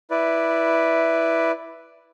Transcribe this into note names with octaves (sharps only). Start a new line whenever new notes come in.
E4 B4 D5